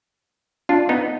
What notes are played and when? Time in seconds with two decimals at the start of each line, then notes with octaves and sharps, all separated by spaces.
0.69 D4 F4
0.89 B3 D#4